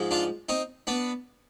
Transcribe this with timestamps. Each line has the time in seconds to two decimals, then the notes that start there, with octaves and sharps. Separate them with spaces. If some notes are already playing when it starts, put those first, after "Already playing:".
Already playing: G#2 F3 G#3
0.11 D4 F4
0.49 C4 D#4
0.87 B3 D4